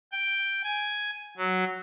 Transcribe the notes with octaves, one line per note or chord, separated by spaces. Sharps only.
G5
G#5
F#3